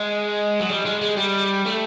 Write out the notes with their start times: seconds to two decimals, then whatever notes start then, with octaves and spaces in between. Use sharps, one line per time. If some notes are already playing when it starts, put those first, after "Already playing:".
Already playing: G#3
0.60 F#3
0.69 G3
0.85 G#3
1.02 G#3
1.17 G3
1.66 A3